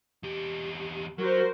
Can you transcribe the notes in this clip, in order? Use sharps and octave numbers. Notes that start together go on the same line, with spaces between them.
E2 G4
F#3 F#4 A#4 C5